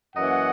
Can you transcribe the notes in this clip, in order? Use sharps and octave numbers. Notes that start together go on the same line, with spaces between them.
F#2 E3 A#3 C#4 D#5 F#5